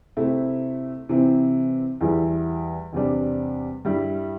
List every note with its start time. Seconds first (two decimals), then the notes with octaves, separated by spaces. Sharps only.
0.17 C3 A3 C4 E4
1.09 C3 E3 C4 E4
2.01 E2 E3 G3 E4
2.93 E2 C3 G3 D4
3.85 G2 G3 E4